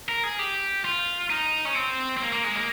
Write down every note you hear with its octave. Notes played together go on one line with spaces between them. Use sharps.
A#4
G#4
G4
F4
D#4
C#4
C4
C4
A#3
A#3
G#3
A#3